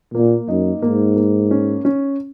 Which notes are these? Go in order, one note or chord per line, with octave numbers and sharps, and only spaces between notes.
A#2 A#3
F#2 D#4
G#2 A#3
A#3
C#4
C#4